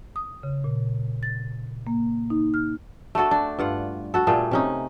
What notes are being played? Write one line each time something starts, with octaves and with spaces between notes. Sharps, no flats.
D#6
C#3
A#2
A6
A#3
D#4
F6
A3 D4 F#4 A4
D4
G2 F4 F#5
F#4 A4
A#2 G3 A3 G#4
C3 C#4 D#4